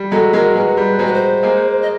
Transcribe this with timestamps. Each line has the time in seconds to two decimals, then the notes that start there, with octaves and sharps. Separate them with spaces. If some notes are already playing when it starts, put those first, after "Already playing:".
Already playing: G3
0.11 F#3 G#3 A4
0.33 F#3 G#3 A#4
0.55 F#3 G#3 B4
0.77 G3
0.99 F#3 G#3 C5
1.06 B4
1.14 C5
1.43 G#3 A#3
1.82 D#5